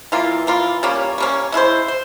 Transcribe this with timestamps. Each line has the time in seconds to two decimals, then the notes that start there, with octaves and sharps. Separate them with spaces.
0.12 E3 A#3 F4
0.47 E3 A#3 F4
0.83 G3 A#3 C#4
1.18 G3 A#3 C#4
1.52 G#3 E4 G#4 C5
1.88 C5